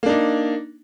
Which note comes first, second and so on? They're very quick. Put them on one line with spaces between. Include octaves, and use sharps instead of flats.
A#3 D4 D#4